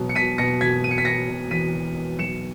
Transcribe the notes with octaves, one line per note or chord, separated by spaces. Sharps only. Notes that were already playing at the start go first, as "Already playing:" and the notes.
Already playing: E1 B2 F#3
C#7
B2 B6 D#7
B2 A#6 C#7
E1 G#6 B6
E1 D#7
C#7
B6
E1 A#6 C#7
B2
E2 B6 D#7
E1
B2
B1 C#7 E7